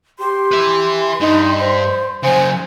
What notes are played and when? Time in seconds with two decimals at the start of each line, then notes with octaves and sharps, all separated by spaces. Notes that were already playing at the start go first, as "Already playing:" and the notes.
0.19 G4 C6
0.51 B4 E5
1.20 G2 D#4
1.59 C5
2.23 C#3 F#3 C5 G#5